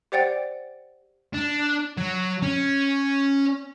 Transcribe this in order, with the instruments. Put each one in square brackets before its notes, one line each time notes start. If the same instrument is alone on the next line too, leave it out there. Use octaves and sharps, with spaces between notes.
[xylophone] G4 C5 D5 F#5 G5 A6
[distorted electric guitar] D4
F#3
C#4